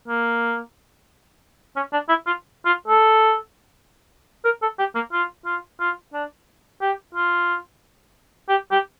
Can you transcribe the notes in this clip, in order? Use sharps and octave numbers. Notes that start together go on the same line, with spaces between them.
A#3
C#4
D4
E4
F4
F4
A4
A#4
A4
G4
A#3
F4
F4
F4
D4
G4
F4
G4
G4